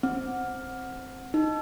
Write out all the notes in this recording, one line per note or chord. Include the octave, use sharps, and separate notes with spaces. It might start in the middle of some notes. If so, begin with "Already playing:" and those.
C4
D#4